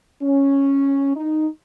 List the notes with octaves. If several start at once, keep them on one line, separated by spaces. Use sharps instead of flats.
C#4
D#4